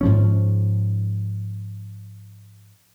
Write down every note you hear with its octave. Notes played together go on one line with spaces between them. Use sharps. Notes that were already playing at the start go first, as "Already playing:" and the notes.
G#2 F3 C#4